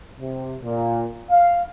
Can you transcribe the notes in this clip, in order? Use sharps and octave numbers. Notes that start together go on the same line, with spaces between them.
C3
A#2
F5